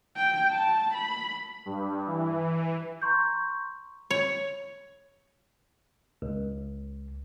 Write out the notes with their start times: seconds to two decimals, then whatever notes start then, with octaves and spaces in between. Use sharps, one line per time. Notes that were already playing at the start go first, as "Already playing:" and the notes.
0.17 G5
0.51 A5
0.94 B5
1.66 G2
2.07 E3
3.02 A#5 C6 C#6 G6
4.11 C#5
6.22 C#2